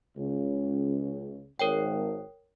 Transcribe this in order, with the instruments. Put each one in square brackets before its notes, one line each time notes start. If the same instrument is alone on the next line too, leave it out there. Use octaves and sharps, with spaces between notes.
[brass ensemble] C#2 C#3
[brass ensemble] G#1 [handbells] A#4 C#5 G5